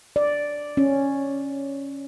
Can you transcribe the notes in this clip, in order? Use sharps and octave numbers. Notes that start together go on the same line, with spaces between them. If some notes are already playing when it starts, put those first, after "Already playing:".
D5
C#4